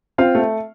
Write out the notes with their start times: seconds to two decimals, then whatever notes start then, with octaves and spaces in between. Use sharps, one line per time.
0.18 C4 F4 F5
0.35 A3